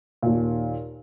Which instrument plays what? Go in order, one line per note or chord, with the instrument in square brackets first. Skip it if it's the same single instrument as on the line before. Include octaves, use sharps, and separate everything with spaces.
[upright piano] D#2 A#2